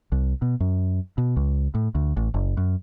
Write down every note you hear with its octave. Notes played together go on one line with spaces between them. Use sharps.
C2
B2
F#2
B2
C#2
A2
D2
A1
F#1
F#2